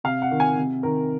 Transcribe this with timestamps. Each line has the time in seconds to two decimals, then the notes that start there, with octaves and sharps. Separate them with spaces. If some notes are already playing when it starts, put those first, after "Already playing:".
0.04 C3 F5
0.22 F#5
0.31 D#3
0.40 G#5
0.57 C3
0.83 D#3 A#4